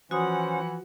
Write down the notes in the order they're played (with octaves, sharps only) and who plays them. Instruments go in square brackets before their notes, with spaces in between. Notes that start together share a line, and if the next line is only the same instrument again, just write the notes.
[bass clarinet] E3 [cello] F3 F#5 [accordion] C#4 C5 [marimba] F#4 D#6